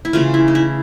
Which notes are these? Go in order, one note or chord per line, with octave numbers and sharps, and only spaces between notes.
E4
C#3 E3 A3 F4
E4
D#4
E4